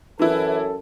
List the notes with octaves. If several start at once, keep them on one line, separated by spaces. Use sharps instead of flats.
F#2 E3 E4 A4 B4